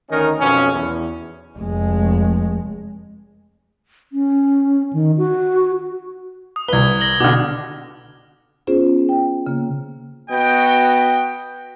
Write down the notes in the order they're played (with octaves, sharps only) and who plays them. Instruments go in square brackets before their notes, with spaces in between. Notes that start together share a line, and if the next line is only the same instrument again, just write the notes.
[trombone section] D2 D#3 C#4 D#4 A#4
B1 F2 B2 C#4
E2
[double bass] F1 G#3
[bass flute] C#4
D#3
F#4
[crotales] D#6
[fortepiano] C2 B4 [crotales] G#6 G7
[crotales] A#6 F#7 G7
[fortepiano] B2 D3 [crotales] D6 F6
[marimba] B3 C#4 F4 G#4 C5
G5
C#3 A#3
[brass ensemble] B3 F#4 D#5 G5